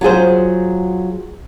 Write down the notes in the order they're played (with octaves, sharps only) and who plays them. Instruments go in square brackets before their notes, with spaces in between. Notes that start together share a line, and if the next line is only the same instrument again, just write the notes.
[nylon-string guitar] F#3 F4 G#4 C5